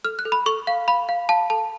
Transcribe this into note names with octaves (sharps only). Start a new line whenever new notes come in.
A4 F6
F#6
A4
B5
A4 C#6
F5
F5 B5
F5
F5 A5
A4 A5